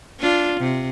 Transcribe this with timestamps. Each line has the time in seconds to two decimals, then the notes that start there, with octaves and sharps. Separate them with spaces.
0.20 D4 F4
0.60 C3